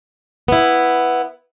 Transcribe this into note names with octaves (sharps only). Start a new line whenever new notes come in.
B3 E4